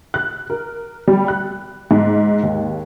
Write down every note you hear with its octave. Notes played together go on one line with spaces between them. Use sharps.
F#6
A#4
G3
F#6
G#2
D#2